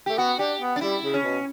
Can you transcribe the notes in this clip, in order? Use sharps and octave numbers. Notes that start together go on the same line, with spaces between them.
A3 G4
B3 F#4
D4 G4
B3
D4
G3 E4
C#3
C#4
B2